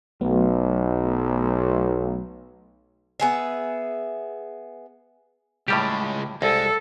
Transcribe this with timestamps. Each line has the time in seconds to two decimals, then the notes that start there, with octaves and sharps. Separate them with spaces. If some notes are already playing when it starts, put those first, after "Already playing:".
0.21 B1 F#3 A3 B3
3.20 B3 G#4 E5
5.68 C#2 A2 G3 G#3 G4
6.42 C2 G#3 A4